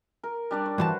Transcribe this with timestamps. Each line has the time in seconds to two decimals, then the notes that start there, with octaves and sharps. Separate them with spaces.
0.23 A#4
0.51 G3 D4 D5
0.66 C#5
0.78 G2 E3 F#4 B4 C5 A5